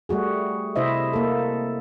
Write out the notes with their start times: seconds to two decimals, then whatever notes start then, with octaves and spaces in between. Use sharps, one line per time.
0.09 G3 A3 F#4 G#4
0.76 C3 E4 C5 D#5 E5
1.13 A#3 A4